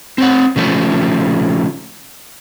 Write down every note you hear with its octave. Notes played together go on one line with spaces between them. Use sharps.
C4 C#5 F#5
C#3 F3 A3 C#4